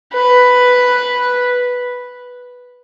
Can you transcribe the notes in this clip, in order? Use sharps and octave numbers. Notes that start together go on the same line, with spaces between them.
B4